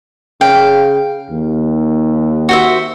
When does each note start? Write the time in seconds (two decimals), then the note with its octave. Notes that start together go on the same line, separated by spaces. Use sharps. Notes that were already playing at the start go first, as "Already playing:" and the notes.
0.41 C#3 F5 G5
1.30 D#2
2.49 F#4 C5 E5